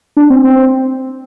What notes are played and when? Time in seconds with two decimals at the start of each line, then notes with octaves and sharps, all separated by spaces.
0.17 D4
0.30 C4
0.44 C4